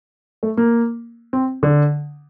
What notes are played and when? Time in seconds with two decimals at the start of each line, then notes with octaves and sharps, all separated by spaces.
0.43 A3
0.57 A#3
1.33 C4
1.63 D3